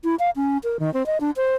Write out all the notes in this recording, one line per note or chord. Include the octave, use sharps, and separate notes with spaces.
E4
F5
C#4
A#4
D#3
C4
D#5
D4
C5